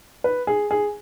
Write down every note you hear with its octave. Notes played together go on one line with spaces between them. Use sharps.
B4
G#4
G#4